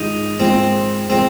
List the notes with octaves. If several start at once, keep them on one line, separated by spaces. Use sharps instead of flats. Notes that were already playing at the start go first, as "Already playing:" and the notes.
Already playing: G#2 D#3 G#3 D#4 F4 G#4
G#2 D#3 G#3 C4 F4 G#4
D#3 G#3 C4 F4 G#4